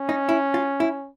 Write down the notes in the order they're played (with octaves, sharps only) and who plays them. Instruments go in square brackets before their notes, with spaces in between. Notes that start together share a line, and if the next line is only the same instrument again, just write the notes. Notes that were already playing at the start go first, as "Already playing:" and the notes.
Already playing: [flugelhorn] C#4
[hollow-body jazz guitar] D#4
E4
F4
E4